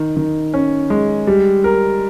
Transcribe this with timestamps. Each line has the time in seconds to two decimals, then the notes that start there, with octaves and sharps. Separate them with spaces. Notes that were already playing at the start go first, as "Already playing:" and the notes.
Already playing: D#3
0.17 D#3
0.54 C#4
0.90 G#3
1.27 G3
1.64 A#4